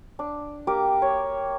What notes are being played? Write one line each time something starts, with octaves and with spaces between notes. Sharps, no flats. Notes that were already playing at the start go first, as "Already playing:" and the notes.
D4
A#3 G4 D6
C#5